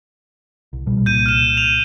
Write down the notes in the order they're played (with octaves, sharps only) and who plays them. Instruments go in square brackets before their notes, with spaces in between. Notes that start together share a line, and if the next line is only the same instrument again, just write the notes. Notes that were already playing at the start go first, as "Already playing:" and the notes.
[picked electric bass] C2
A#1 B2 G3
[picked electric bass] C2 A#2 [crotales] G6 D#7
[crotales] F6 E7
D#7 F7